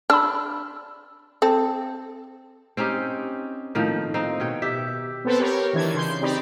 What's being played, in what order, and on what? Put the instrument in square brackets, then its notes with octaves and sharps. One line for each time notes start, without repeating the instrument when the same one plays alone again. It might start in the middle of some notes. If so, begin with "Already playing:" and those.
[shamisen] D4 [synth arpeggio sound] B5 E6
[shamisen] C4 A4
[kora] C4 C#4 D#4 G4
A2 D#3 F3 A#3
C4 D#4
B2 C#5 G5
G4 E5
[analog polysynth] B3 C4 A4 B4 C5
G4 A#4 C#5
D#3 E3 D4 G#6
C#3 C6 G6
C4 D#4 G4 D5 B5